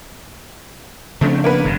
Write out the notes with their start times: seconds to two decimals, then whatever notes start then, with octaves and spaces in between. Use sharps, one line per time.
1.21 C#3 F3 A3 C4 D4
1.44 A#3 B3 B4
1.65 F1 G2 D3